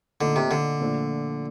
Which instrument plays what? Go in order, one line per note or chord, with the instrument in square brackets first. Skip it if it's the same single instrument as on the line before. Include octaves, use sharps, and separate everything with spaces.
[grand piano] A#2 A3 D#4 [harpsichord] D3
[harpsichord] C3
D3
[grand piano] A#2 F3 A3 D4